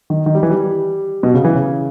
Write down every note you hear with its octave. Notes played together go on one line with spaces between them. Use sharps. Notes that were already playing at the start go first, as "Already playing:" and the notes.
D#3
D#3
G3
E3
G3
B2
C#3
E3
C#3